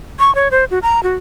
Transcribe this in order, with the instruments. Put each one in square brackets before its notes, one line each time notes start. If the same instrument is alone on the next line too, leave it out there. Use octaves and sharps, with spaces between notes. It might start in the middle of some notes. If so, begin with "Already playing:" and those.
[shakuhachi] C#6
C#5
C5
F#4
A#5
F#4